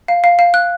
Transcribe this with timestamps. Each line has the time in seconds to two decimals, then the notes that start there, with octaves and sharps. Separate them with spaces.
0.08 F5
0.24 F5
0.39 F5
0.54 F#6